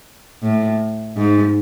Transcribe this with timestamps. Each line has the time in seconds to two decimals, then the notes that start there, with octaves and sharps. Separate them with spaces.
0.43 A2
1.17 G#2